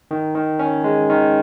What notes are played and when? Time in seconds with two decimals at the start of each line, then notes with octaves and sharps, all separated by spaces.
0.11 D#3
0.35 D#3
0.59 C#4
0.84 G#3
1.09 D#3